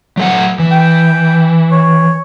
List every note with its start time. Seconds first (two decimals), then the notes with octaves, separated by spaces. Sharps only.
0.17 F#3 A3 F#5
0.59 E3
0.72 G5
1.72 C#5